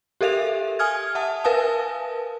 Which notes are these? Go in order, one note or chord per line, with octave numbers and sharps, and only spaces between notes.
G4 A4 A#4 E5 F5 F7
G#5 D#6 F6 G#6
E5 F#5 A5
A#4 B4 F5 G#5 A5 D#6